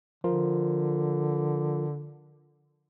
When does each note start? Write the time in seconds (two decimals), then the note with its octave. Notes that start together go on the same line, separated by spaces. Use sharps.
0.24 D3 F3 F4 A#4